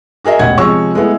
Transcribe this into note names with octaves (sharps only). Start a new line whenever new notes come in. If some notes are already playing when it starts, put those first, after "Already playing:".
F#4 G#4 A#4 D#5 E5
E1 A1 F#5 G#6
C3 F3 G#3 C#5 C#6 E6
G#3 A3 B3 E4